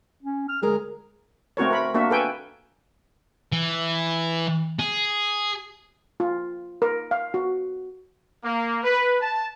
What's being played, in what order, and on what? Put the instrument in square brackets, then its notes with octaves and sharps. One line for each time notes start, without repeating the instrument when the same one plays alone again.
[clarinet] C#4
F6
[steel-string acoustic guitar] D2 G#3 A#4 [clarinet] G#4
[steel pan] A3 C4 F#4 A#4 C#5
A#4 B5
A#3 D4 F#4 E5
A4 B4 G5 G#5
[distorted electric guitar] E3
G#4
[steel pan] F4
A#4
F5
F#4
[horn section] A#3
B4
A5